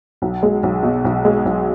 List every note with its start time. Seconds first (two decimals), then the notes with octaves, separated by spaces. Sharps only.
0.22 B1
0.43 G#3
0.63 B1
0.83 B2
1.04 B1
1.25 G#3
1.45 B1